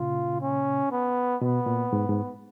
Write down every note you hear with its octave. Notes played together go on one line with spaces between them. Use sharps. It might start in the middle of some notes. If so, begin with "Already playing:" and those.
Already playing: A#2 C#3 F4
C#4
B3
B2 B3
A#2
G#2
G#2